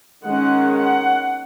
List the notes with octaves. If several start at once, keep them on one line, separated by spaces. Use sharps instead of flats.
D#3 G#3 C#4 F#5
F#5